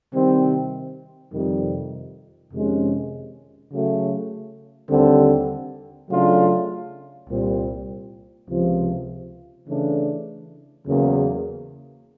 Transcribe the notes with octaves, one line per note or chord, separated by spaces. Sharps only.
C3 D#3 G3 C4
F2 C3 D#3 G3
F2 C3 D#3 G#3 C#4
C#3 F#3 A3
D#2 D3 G3 C4
C#3 F#3 A3 D4 F4
C2 A#2 G3 C4
C#2 C3 F3
C#3 E3 A3 D4
E2 C#3 F#3 A#3